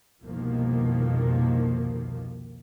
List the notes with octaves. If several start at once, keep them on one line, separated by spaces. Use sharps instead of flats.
C2 F2 B2 D#3 F3 A#3